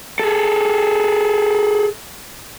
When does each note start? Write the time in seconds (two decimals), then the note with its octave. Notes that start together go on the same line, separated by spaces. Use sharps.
0.19 G#4 A4